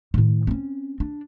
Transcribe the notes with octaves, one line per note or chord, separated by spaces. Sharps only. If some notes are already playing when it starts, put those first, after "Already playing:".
A2 D#3
C4 C#4
D4